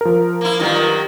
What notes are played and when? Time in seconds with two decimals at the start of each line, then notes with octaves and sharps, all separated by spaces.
0.01 F3 A#4
0.41 A#3 E4
0.60 G2 D#3 F#3